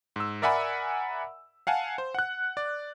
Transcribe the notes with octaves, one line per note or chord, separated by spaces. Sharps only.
G#2 E6
A#4 D5 E5 F#5 G#5 B5
F5 F#5 G#5 A5
C5
F#5 F#6
D5